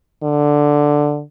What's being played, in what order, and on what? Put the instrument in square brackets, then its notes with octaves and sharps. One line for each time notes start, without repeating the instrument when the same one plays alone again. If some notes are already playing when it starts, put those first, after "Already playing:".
[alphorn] D3